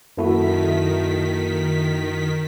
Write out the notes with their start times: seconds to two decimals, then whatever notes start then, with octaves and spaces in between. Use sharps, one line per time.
0.17 F#2 D#3 A#3 E4 F#4 A4 E5 B6